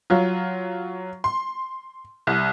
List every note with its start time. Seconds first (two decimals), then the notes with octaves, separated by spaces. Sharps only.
0.10 F#3 F4
1.24 C6
2.27 C2